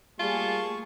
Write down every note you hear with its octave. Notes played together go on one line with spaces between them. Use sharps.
G3 A3 A#3 F4 G#4 A5 C#6